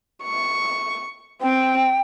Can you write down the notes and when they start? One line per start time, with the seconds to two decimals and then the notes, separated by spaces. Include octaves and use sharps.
0.24 C#6
1.42 C4 G5